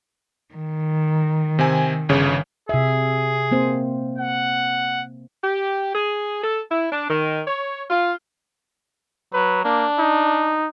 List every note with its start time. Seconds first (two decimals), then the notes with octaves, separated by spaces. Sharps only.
0.55 D#3
1.59 C3 C4 G#5
2.09 G1 C#3 C#5
2.69 C3 G#4 E5
3.51 A#3 C4 C5
4.18 F#5
5.44 G4
5.95 G#4
6.44 A4
6.71 E4
6.92 D4
7.10 D#3
7.47 C#5
7.90 F4
9.34 F#3 B4
9.64 A#3 D4
9.98 D#4